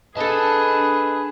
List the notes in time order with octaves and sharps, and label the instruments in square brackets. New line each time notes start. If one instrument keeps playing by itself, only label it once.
[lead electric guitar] D4 A5 [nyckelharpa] G#4 [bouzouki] A4 D#5 [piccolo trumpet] B4